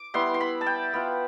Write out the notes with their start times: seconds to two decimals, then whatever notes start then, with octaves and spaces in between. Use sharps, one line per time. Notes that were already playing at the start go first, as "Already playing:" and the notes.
Already playing: D6
0.14 G3 B3 E4 C6
0.34 C6
0.41 B5
0.61 A5
0.66 G5
0.93 B3 F4